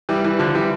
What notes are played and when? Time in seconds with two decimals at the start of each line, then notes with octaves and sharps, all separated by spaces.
0.09 E3 G3
0.24 E3 G3
0.39 D3 F3
0.55 E3 G3